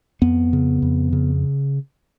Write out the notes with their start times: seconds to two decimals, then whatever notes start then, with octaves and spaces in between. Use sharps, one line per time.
0.22 F2 B3
0.53 C#3
0.82 F2
1.13 C#3